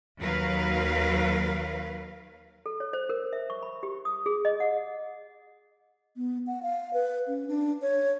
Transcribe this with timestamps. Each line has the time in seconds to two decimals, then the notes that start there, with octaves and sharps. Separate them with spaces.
0.18 D#2 F#3 A#4 B4 F5
2.66 A4
2.80 C#5
2.93 C5
3.09 A#4
3.33 E5
3.50 C#6
3.62 B5
3.83 G4
4.05 D#6
4.26 G#4
4.45 D#5
4.60 F#5
6.17 B3
6.47 F#5
6.63 F5
6.93 B4
7.27 C#4
7.48 D4
7.82 C#5